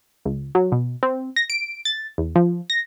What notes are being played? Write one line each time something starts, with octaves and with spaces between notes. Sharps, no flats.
C#2
F#3
B2
C4
A#6
D7
A6
E2
F3
A#6